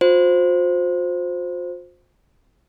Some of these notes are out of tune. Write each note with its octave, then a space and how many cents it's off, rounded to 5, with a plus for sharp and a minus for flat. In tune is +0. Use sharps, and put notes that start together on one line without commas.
F4 +45 C5 +0